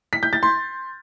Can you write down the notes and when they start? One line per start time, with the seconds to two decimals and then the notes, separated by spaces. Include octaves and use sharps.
0.13 B6
0.23 G6
0.33 A6
0.43 C6